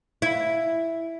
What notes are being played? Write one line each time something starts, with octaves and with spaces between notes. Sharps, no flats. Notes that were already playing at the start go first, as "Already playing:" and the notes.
E4